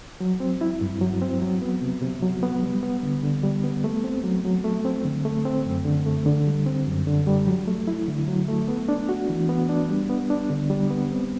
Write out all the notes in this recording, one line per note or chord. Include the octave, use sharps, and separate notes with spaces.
F#3
C4
E4
G2
F#3
C4
F#3
B3
C3
C3
F#3
B3
G3
B3
D3
D3
G3
B3
A3
C4
F#3
F#3
A3
C4
D3
A3
C4
F#2
D3
A3
D3
G3
C4
F#2
D3
G3
F#3
A3
E4
D3
F#3
A3
B3
D4
F#4
E3
B3
D4
G3
B3
D4
D3
G3
B3
C4